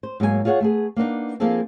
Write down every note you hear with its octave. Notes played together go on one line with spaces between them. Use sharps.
C5
G#2 F#3 A#3 B4 G#5
F4 G#4 C#5 E5 F#5
A3 B3 G#4
A#3 B3 D4 D#4
F3 A#3 C4 D#4 G#4 A4